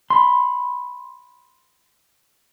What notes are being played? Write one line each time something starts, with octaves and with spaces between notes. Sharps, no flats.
B5 C6